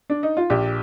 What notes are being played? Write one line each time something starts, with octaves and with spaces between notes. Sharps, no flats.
D4
D#4
F4
A#1 G4